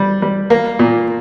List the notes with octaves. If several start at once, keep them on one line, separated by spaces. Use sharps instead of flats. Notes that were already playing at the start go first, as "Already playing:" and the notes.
Already playing: G3
G3
A#3
A#2